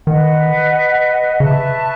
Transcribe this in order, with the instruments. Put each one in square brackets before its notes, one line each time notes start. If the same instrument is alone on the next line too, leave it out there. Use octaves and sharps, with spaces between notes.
[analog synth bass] D#3 [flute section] B4 D#5 F#5
[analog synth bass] C#3 [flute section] B4 E5 A5 C#6